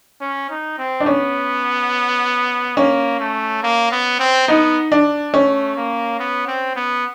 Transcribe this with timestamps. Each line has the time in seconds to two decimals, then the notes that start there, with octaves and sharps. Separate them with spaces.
0.21 C#4
0.50 D#4
0.78 C4
1.00 D4
1.06 B3 C#4
2.77 A#3 C#4
3.20 A3
3.63 A#3
3.92 B3
4.19 C4
4.48 B3 D#4
4.92 D4
5.33 A3 C#4
5.77 A#3
6.19 B3
6.47 C4
6.76 B3